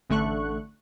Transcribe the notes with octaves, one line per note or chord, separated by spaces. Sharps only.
A1 D3 A3 C#6 F#6